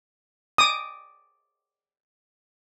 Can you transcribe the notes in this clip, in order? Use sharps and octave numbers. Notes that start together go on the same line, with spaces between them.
D6 D#6